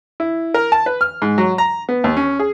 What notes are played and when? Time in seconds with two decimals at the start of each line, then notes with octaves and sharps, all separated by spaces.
0.20 E4
0.54 A#4
0.72 A5
0.86 B4
1.01 F6
1.22 G#2
1.38 F#3
1.58 A#5
1.89 B3
2.04 D#2
2.17 C#4
2.39 G#4